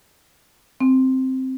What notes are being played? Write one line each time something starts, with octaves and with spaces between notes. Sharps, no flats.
C4